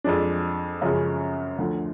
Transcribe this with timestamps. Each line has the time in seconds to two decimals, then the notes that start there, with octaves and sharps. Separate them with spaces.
0.04 F2 F3 G#3 D4
0.81 F#2 C#3 F3 G#3 C#4
1.58 D2 D3 F3